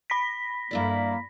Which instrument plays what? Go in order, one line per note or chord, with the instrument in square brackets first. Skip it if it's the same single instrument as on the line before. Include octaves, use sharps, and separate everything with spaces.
[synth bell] B5 A#6 B6
[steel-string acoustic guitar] G2 E4 D5 [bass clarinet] A#3